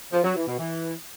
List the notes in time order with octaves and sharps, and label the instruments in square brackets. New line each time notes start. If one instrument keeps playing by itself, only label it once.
[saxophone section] F3
F#3
E3
B2
E3